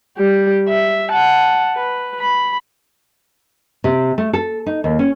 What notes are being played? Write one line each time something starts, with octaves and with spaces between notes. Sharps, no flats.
G3 G4
E5
F#5 A5
B4
B5
C3
A3
A4
D#4
D#2
C#4